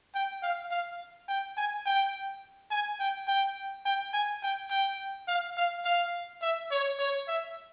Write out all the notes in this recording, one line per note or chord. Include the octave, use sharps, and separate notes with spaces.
G5
F5
F5
G5
G#5
G5
G#5
G5
G5
G5
G#5
G5
G5
F5
F5
F5
E5
C#5
C#5
E5